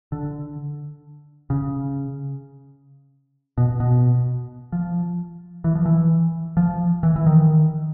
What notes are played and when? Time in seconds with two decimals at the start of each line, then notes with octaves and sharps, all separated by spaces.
0.12 D3
1.50 C#3
3.58 B2
3.80 B2
4.72 F3
5.64 E3
5.75 F3
5.86 E3
6.57 F3
7.03 E3
7.16 E3
7.26 D#3